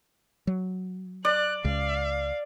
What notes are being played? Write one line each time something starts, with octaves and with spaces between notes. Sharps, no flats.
F#3
D5 F#6
C#2 C#3 F5